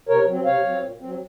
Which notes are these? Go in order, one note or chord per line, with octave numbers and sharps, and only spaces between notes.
C3 A#4 C#5
F#3 C4
C3 C#5 F5
F#3 C4
A#2
F#3 C4